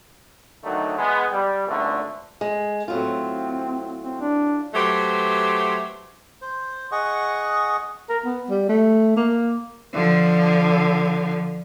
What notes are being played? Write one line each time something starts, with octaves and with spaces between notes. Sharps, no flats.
D3 D#3 F#3 A3 D#4
G#3 B3
G3
G#1 C#2 D3 A3
G#3
A2 F#3 C4 F4
C4
D4
F#3 A3 G4 B4 C5
C5
G#4 D#5 F#5 C#6
A#4
B3
G3
A3
A#3
D3 F3